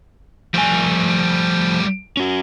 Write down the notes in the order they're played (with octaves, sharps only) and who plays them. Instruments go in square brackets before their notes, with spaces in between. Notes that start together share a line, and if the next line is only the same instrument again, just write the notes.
[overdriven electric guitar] F3 G#5 [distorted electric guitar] G3 A3
[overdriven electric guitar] C#4 F#4